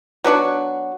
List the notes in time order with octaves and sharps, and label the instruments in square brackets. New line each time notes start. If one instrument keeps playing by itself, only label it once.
[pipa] F#3 B3 D4 F#4